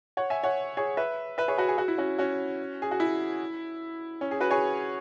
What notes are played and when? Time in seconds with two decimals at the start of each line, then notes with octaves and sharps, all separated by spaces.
0.17 C#5 F#5
0.30 E5 G#5
0.43 C#5 F#5
0.77 G#4 C#5
0.97 B4 E5
1.38 B4 E5
1.48 G#4 C#5
1.58 F#4 B4
1.68 G#4
1.78 F#4
1.88 E4
1.98 C#4 F#4
2.18 C#4 F#4
2.82 G#4
2.91 F#4
3.00 E4
4.21 C#4
4.31 G#4
4.40 F#4 B4
4.51 G#4 C#5